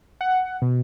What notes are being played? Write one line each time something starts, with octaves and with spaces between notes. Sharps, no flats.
F#5
B2